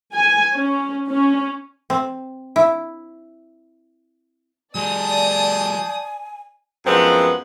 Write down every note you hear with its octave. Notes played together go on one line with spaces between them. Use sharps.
G#5
C#4
C#4
C4
E4
F#3 G#3 C5 D5 G#5 A5 D#6
F#2 F3 G#3 B3 C4